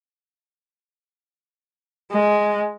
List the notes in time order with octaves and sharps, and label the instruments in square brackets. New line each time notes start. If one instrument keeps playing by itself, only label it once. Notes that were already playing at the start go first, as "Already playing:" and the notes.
[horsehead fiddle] G#3